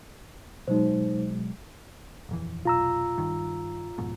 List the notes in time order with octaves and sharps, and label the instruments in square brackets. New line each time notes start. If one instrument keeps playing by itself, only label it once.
[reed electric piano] B2 F#3 G#3 [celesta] D#4 C5
[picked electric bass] D#1 F2 E3
[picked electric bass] F1 B1 [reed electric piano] F4 A#5 E6
[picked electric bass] G2 D#3
F2 G#2 B2